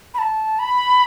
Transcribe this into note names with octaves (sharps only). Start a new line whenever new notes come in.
B5
A5
B5